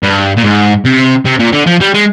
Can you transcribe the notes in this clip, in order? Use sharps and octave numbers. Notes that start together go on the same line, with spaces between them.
G2
A#2
G#2
C3
C3
A#2
D3
F3
G3
G#3